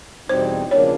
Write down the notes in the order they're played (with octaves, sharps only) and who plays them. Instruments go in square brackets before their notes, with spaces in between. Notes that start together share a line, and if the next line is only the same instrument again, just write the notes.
[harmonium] E2 B2 G3 C4 D#4 [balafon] C5
[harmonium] C#3 F3 A#3 D4 [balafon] C#5